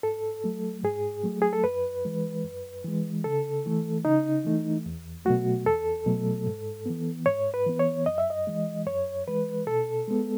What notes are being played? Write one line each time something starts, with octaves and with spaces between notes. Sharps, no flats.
G#2 A4
F#3 A3
G#2 G#4
F#3 A3
G#4
A4
F#2 B4
E3 G#3
F#2
E3 G#3
C#3 A4
E3 A3
C#3 D#4
E3 A3
E2
B2 F#3 A3 F#4
E2 A4
B2 F#3 A3
G#2
E3 B3
G#2 C#5
B4
E3 B3
C#5
F#2 D#5
E5
D#5
E3 G#3
F#2 C#5
E3 G#3 B4
B2 A4
G#3 B3